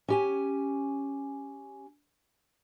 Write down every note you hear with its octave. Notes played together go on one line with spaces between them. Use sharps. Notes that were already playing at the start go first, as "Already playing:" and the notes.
C#4 G4 G#5